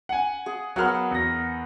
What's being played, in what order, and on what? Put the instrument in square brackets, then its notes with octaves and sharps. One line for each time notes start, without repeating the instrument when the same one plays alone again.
[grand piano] F#5 G#5
[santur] G#4
[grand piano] F#3 F6 [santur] B3 A#4 F#5
[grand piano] E2 A#6